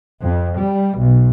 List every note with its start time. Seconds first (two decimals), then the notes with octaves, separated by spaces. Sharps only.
0.22 F2
0.59 G3
0.99 B1